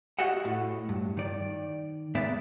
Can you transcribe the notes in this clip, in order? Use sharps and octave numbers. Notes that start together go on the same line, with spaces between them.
F#4 G4 D#5 E5 F#5
A2
G2
D#3 D5
G#2 B3 D5 E5